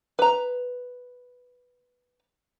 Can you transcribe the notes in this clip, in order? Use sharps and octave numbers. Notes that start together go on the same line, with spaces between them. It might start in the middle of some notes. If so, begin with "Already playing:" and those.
B4 A#5